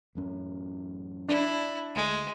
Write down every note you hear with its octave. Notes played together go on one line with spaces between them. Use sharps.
A1 F#2 C#4
D4 E4
D2 G#3